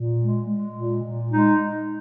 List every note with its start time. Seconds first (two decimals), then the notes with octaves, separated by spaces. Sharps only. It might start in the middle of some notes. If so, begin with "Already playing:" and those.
Already playing: A#2
0.19 G#3
0.48 G#3
0.75 A#2
1.03 A#2
1.31 G#3 D#4